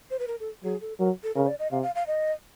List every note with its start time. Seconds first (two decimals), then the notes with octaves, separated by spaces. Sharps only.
0.10 C5
0.19 B4
0.27 A#4
0.40 A4
0.64 F#3 G#4
0.81 A4
0.99 F#3 A#4
1.23 A4
1.35 C#3 A#4
1.47 D5
1.59 D#5
1.71 C3 F5
1.83 F5
1.95 F5
2.07 D#5